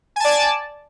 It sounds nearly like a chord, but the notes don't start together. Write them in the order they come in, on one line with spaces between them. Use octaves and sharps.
G#5 A5 D5